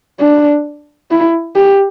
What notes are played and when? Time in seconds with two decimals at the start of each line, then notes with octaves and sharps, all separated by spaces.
0.20 D4
1.11 E4
1.56 G4